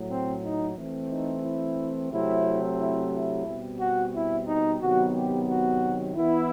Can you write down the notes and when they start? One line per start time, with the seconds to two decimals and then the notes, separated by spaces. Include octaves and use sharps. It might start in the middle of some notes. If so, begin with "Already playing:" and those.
Already playing: A2 F#3
0.08 C4
0.42 D#4
0.76 E3 A3 C4
1.09 D#4
1.43 E4
2.10 C3 F#3 A3 C4 E4
2.78 E4
3.12 E4
3.46 B2 G3 C4
3.79 F#4
4.13 E4
4.47 D#4
4.79 C3 D#3 F#3 B3 F#4
5.13 G4
5.47 F#4
6.15 E3 B3 E4